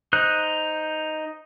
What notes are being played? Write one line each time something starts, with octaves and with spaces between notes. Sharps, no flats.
D#4 C5 F#6